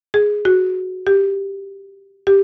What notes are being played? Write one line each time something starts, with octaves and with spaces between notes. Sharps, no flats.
G#4
F#4
G4
G4